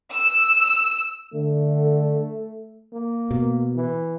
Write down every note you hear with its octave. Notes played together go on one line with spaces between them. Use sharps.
E6
D3 A3
A#3
B2
E3